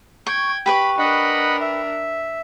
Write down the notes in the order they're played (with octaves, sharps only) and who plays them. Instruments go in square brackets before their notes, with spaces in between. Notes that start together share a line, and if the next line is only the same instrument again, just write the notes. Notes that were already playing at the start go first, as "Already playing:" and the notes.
[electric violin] G5 G#6 [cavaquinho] C#6
[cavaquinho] G4 B4 C#6 [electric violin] B5
[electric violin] D4 A#4 [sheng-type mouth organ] D#5 F#5 B5
[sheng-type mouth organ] E5